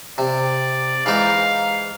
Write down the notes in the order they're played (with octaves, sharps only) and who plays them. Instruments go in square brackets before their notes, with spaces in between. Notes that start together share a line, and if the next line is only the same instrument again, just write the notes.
[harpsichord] C3 [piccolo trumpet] D5
[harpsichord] G#2 E3 D#4 [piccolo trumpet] F5